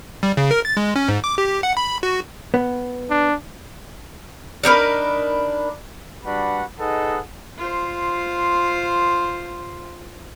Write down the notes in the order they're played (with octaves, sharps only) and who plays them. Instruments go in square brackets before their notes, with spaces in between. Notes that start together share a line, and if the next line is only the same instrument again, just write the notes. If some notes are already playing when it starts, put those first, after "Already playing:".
[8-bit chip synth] G3
C#3
A#4
A6
G#3
C#4
G#2
D6
G4
F#5
B5
F#4
[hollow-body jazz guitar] B3
[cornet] D4
[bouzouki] D4 D#4 A#4 B4
[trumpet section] G3 D4 F#4 B4 F#5 B5
D#4 G#4 A4 B4 D#5 F#5
[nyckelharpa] F4 C5